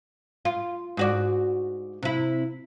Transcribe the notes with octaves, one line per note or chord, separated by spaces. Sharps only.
F4
G#2 F#4 D5
C3 E4